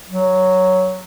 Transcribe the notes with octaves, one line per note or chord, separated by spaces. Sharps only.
F#3